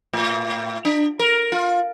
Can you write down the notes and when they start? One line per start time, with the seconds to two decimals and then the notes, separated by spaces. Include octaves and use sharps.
0.13 A2
0.85 D4
1.19 A#4
1.52 F4